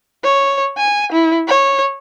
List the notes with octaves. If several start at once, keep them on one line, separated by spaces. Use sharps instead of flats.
C#5
G#5
E4
C#5